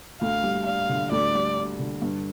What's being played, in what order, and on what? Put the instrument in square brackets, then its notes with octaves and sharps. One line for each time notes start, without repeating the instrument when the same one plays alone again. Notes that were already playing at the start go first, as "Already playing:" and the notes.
[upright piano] D2 [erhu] F5
[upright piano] G3
[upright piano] D4 [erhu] F5
[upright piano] D3
[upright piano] D2 [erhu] D5
[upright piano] G3
D4
D3
G2